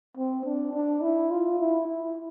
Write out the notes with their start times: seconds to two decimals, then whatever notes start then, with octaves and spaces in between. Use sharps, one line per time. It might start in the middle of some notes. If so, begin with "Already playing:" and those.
0.17 C4
0.45 D4
0.74 D4
1.02 E4
1.30 F4
1.59 E4
1.88 E4